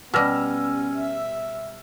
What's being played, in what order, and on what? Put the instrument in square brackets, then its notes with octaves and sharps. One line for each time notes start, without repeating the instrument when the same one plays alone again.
[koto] B2 G3 [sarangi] B3 [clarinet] C#4 [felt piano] E6 F6 A#6
[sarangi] E5